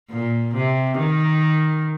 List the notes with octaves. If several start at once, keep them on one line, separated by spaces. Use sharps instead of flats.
A#2
C3
D#3